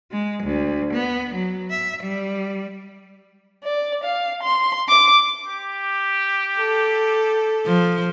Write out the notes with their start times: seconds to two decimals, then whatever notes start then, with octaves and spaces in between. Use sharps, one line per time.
0.12 G#3
0.44 D2
0.94 B3
1.35 F#3
1.71 E5
2.03 G3
3.64 D5
4.04 F5
4.43 C6
4.89 D6
5.47 G4
6.57 A4
7.67 F3